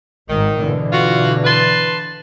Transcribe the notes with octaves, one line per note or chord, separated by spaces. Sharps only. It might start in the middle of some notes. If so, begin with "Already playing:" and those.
G#1 G#2 D#3
B2 D3 E3
F4 F#4
B4 A5 C6